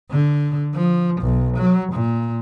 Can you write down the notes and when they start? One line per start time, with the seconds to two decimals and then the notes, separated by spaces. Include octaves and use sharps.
0.11 D3
0.74 F3
1.21 B1
1.57 F#3
1.93 A#2